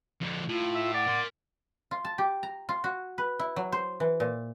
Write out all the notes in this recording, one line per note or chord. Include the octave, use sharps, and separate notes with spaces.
F2 D3
A2 F4
E5
D5 F#5
A#4 C6
F4
A5
G4
A#5
F4
F#4
B4
E4
F#3
C5
E3
A#2